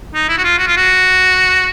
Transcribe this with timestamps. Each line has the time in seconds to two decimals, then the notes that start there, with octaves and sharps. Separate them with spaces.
0.15 D#4
0.29 E4
0.38 F#4
0.44 F4
0.58 F#4
0.67 F4
0.77 F#4